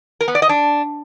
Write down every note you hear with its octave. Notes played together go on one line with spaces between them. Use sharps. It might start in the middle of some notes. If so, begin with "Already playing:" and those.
A#4
B3
D5
D#5
D4